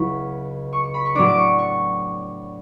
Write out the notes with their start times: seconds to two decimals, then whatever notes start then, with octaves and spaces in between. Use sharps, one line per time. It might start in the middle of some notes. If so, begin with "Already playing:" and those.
Already playing: C#2 C#3 F#3 B3 E4 B5 C#6
0.73 C#6
0.84 C#6
0.94 B5
1.05 C#6
1.15 A2 F#3 B3 D4 D6
1.28 D6
1.38 C#6
1.59 C#6